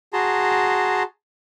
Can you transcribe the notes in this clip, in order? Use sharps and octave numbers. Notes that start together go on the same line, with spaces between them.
F#4 G#4 A5 A#5 C6